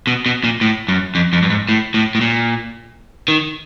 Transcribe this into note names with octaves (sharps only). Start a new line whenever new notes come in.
B2
B2
A#2
A2
F#2
F2
F2
G2
G#2
A2
A2
A2
A#2
D#3